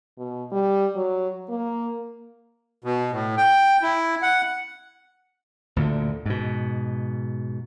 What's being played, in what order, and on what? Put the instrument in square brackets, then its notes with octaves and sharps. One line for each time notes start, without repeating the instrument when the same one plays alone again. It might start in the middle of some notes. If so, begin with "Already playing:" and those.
[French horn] B2
G3
F#3
A#3
[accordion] B2
A2
G5
E4
F#5
[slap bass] D2 A#2 D3
G#2 B2